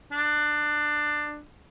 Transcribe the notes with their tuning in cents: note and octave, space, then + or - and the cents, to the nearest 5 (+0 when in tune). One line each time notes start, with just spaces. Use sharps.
D4 +20